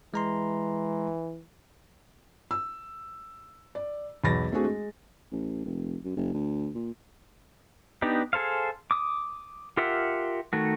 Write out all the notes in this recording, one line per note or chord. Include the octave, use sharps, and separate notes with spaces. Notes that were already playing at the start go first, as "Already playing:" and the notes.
E3 G#3 A#5 C6
E6
D5
B1 E2 B5 A6 A#6
A3 C4 D4 F#4 G#4
G#3
A1
F1
F#2
F#1
D2
A#2
B3 D4 D#4 G4
G#4 A4 C5 F5
D6 D#6
F4 G4 A#4 E5 F#5
D#3 A3 F#4